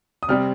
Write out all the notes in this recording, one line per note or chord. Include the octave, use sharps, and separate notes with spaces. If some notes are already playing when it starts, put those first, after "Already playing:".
D#6
C3 G3 C4 F6